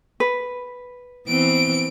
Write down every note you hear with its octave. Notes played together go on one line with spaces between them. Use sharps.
B4
E3 B3 C4 D7